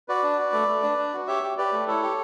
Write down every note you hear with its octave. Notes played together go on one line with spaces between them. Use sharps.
F#4 B4 D5
D4
F#4
A3
A3
D4
D4
F#4
G4 C#5 E5
G4
G4 B4 D5
A3
E4 A4 C#5
G4